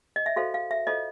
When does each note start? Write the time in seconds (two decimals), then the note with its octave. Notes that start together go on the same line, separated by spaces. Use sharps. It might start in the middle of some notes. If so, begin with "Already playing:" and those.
0.16 D#5
0.26 E5
0.36 F#4 A4 C5 F5
0.54 F5
0.71 E5
0.87 F4 A4 C5 D#5